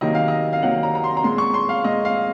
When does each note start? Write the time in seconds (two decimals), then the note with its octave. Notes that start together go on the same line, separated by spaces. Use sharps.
0.01 C3 D#3 F#3 A#3 D#5
0.15 F5
0.28 D#5
0.53 F5
0.62 C3 D#3 F#3 A#3 F#5
0.83 A#5
0.95 A#5
1.04 C6
1.17 A#5
1.24 A#2 G#3 C6
1.38 C#6
1.54 C6
1.69 F5
1.84 A#2 G#3 D#5
2.05 F5